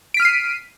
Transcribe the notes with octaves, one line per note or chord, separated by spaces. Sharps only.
F6 B6 C7 D7 D#7